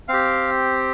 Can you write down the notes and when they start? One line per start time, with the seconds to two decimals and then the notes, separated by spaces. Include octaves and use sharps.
0.08 C4 G4 F5